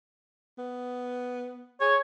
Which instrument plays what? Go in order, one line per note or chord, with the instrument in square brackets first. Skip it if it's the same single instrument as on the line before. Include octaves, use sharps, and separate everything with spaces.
[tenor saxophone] B3
[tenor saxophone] G#4 [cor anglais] C#5